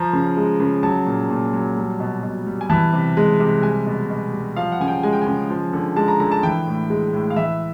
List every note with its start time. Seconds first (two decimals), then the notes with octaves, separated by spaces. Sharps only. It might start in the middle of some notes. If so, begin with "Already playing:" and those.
Already playing: F3 A#5
0.13 C#3
0.37 G#3
0.60 C#3
0.83 F#3 A5
1.06 A#2
1.30 A#2
1.53 F#3
1.77 G3
2.00 B2
2.23 B2
2.47 G3
2.61 G#5
2.70 E3 A5
2.93 C3
3.17 G#3
3.40 C3
3.63 G3 G#5
3.86 B2
4.10 B2
4.33 G3
4.56 F3 F5
4.72 F#5
4.80 C#3 G#5
4.88 G5
5.03 G#3 G#5
5.13 G5
5.22 C#3 G#5
5.50 F3
5.73 D3
5.96 G#3 A5
6.08 A#5
6.20 D3 A#5
6.32 A5
6.43 E3 G5
6.66 A2
6.90 G#3
7.13 A2
7.30 F5
7.36 E3 E5